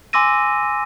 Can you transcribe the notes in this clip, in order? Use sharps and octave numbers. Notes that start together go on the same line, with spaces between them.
G#5 C6 D6 E6 A#6 D#7